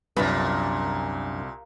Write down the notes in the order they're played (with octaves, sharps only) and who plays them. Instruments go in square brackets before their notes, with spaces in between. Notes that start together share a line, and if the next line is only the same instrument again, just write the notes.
[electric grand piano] C2 [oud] F#2 D4 B4 [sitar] A#2